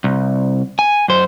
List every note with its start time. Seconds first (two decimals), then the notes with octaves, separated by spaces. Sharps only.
0.04 C2
0.79 G#5
1.08 F#2 C5